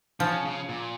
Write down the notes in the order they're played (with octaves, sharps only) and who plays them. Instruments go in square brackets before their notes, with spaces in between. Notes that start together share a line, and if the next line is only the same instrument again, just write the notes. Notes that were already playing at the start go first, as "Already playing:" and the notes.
[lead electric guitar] C#3 C#4 [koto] F3
[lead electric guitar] C#3
A#2